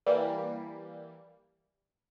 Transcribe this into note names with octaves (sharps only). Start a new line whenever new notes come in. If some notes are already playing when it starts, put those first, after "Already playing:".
E3 G3 A#3